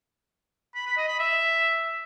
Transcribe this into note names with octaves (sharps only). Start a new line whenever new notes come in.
B5
B5
D#5
B5
E5